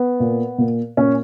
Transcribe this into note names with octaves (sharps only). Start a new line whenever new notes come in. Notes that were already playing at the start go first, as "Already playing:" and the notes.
Already playing: B3
A#2
A#2
A#2 C#4